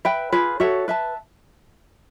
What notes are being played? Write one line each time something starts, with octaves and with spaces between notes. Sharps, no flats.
B4 E5 G5 B5
F4 G#4 B4
F#4 A4 C#5 E5
B4 E5 A5